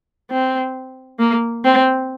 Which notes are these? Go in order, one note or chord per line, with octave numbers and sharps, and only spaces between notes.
C4
A#3
C4